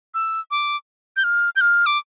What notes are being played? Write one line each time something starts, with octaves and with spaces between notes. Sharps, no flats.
E6
D6
G6
F6
G6
F6
D6